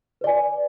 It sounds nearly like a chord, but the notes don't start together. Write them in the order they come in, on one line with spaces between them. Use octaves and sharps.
B4 D5 G#5